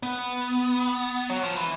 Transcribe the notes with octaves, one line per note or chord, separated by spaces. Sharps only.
B3
F#3
F3
E3